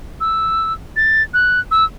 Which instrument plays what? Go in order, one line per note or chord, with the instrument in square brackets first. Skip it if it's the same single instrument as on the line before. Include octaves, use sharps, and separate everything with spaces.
[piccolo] E6
A6
F#6
E6